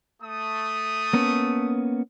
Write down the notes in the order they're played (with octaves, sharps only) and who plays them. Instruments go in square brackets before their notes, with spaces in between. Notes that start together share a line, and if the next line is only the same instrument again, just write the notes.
[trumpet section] A3 D#6
[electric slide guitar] A#3 B3 C#4